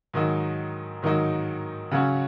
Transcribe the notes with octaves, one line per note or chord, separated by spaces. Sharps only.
G#2 D#3 F#3 D#4
G#2 D#3 F#3 D#4
C#3 F#3 C#4 F#5